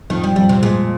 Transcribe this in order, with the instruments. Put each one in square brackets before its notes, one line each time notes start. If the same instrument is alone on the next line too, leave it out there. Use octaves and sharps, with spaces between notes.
[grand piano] F2 [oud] D#3
[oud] G3
[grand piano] F2 [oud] G3
[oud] C3
[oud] A#2 [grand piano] G#3